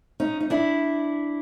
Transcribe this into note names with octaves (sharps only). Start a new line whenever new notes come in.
C#4 D#4
D#4
D4 E4